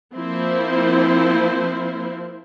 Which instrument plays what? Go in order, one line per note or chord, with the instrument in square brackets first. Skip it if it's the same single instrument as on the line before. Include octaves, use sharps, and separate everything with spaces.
[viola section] F3 A#3 C4 E4 C5